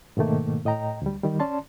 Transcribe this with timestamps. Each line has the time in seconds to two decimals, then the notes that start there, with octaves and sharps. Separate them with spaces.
0.17 G#2 B2 D#3 A3 A#3
0.65 A2 D#5 G5 A#5
1.02 D2 G3
1.23 D#3 G3
1.40 C#4 D5 A5 C6